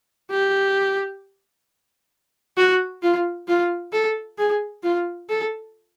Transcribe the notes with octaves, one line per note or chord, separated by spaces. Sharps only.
G4
F#4
F4
F4
A4
G#4
F4
A4